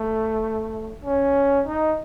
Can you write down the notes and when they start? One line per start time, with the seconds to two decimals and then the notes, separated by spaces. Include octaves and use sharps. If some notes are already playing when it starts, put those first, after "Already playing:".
Already playing: A3
1.05 C#4
1.66 D#4